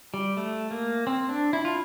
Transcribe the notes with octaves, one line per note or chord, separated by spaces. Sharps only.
G3
A3
A#3
C4
D4
E4
F4